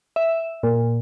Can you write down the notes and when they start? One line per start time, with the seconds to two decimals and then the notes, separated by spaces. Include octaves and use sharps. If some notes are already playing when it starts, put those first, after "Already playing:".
0.16 E5
0.63 A#2